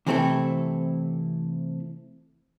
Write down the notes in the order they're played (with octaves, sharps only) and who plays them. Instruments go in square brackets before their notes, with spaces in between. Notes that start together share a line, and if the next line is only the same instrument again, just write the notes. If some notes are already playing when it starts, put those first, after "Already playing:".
[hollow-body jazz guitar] C3 E3 A3 C4 E4 A4